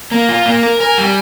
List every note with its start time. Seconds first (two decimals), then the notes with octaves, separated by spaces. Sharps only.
0.11 A#3 A#5
0.29 F4
0.45 A#3 A#5
0.63 A#4
0.81 A#4 G#5
0.98 G3